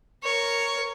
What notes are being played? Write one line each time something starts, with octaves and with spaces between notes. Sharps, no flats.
A#4 C#5